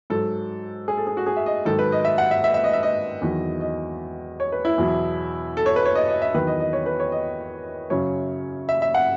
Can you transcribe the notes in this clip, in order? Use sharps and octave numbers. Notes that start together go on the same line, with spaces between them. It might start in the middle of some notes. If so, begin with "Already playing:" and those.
G#2 F#3 A4
G#4
A4
G#4
F#4
G#4
E5
D#5
G#2 D#3 F#3 A4
B4
D#5
E5
F#5
E5
E5
E5
D#5
E5
D#5
E2 D#3 F#3
D#5
C#5
B4
E4
E2 B2 F#3
A4
C#5
B4
C#5
D#5
D#5
E5
E2 D#3 F#3 B4
D#5
D#5
C#5
B4
C#5
D#5
F#2 C#3 F#3 C#5
E5
E5
F#5